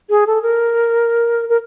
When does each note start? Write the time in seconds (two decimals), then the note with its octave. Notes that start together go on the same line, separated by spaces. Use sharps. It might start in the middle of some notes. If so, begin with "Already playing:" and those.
0.10 G#4
0.27 A4
0.43 A#4
1.49 A#4